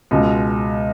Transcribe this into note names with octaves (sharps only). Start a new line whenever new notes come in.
C#2 B2 G#3